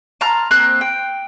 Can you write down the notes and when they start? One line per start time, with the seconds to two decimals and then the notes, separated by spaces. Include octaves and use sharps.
0.21 A5 A#5 C6 F6
0.51 A#3 C4 F#6
0.81 G5